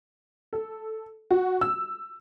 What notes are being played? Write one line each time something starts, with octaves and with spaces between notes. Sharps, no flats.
A4
F#4
E6